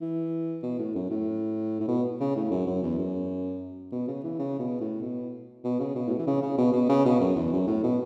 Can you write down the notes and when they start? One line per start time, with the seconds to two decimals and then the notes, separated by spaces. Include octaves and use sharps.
0.01 E3
0.63 B2
0.79 A2
0.95 F#2
1.10 A2
1.80 A2
1.88 B2
2.20 C#3
2.36 A2
2.51 F#2
2.67 F#2
2.83 E2
2.98 F#2
3.92 B2
4.08 C#3
4.24 E3
4.39 C#3
4.59 B2
4.81 A2
5.02 B2
5.65 B2
5.80 C#3
5.96 B2
6.07 A2
6.10 B2
6.19 E3
6.27 C#3
6.42 C#3
6.58 B2
6.73 B2
6.89 C#3
7.05 B2
7.20 F#2
7.36 E2
7.52 F#2
7.67 A2
7.83 B2